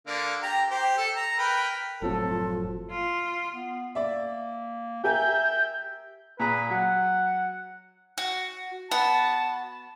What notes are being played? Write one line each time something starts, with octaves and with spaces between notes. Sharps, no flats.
D3 A#3 D5
G4 A#5
G4 C5
A4
A#5
A#4 B4 G5
F#1 A2 F3 F#3 C4 F4 A4
F4
B3
A#3 D5 E5
G4 A#4 E5 G#5 G6
A#2 G#4 B4 A#5
F#3 F#5
F#4
B3 F#4 A5